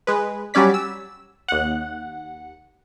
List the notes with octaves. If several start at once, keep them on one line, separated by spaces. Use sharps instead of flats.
G#3 B4
F#3 G3 C#4 D5 B6
E6
D#2 F#5